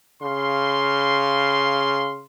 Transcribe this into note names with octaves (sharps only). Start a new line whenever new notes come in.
C#3 F5 C6